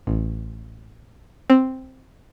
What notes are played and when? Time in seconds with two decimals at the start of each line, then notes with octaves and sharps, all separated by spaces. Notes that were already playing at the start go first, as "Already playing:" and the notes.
0.07 A1
1.50 C4